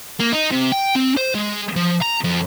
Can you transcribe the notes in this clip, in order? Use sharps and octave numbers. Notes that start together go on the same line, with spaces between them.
A#3
D#4
C3
G5
C4
C5
G#3
F3
A#5
F2